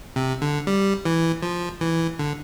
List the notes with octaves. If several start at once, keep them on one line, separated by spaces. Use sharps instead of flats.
C3
D3
G3
E3
F3
E3
D3